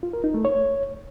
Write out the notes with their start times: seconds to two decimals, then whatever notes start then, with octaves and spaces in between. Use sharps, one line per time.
0.03 F4
0.13 A#4
0.24 D#4
0.34 A3
0.45 C#5